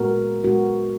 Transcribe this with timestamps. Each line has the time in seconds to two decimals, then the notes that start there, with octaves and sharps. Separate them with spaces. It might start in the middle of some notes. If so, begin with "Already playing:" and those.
Already playing: A#2 G#3 B3 F#4 A#4
0.44 A#2 G#3 B3 F#4 A#4